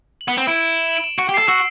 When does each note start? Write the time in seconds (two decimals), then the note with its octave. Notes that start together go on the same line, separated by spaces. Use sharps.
0.21 F#7
0.28 B3 G7
0.37 C4 E7
0.47 E4 D7
0.73 E7
0.88 F#7
0.96 D7
1.04 E7
1.18 F#4 D7
1.29 G4
1.34 C7
1.38 A4
1.48 F#4 E6